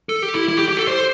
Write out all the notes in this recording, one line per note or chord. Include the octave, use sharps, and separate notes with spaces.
A4
G4
E4
E4
G4
G4
A4
C5